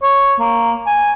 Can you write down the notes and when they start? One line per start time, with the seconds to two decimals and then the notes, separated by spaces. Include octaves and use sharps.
0.02 C#5
0.40 A#3
0.87 G#5